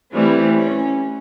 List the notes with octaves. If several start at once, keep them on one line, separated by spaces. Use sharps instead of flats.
E3 G3 A3 C4
C#4